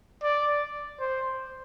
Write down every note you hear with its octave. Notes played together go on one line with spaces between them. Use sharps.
D5
C5